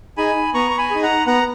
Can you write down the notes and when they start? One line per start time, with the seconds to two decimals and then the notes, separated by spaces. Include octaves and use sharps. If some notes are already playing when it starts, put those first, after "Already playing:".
0.17 D#4 G#4 G#5 B5
0.54 B3 A#5 C#6
0.71 C#6
0.78 G#5 B5
0.90 D#4 G#4
1.03 F#5 A#5
1.26 B3 F#5 A#5